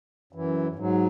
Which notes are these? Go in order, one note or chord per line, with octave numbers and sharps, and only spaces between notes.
F#2 E3
G#2 F#3